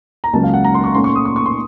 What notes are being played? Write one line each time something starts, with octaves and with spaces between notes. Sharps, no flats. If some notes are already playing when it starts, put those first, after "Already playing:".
A#5
C#2 C#3 F#3 A#3 C#4 A5
F5
F#5
A#5
C6
C#6
A#2 A3 C#4 C6
C#6
D#6
C#6
C#6
C6